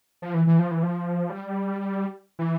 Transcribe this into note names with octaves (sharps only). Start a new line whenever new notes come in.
F3
E3
E3
F3
E3
F3
G3
E3